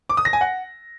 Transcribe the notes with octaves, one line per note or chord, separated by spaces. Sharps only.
D6
D#6
A#6
G#5
F#5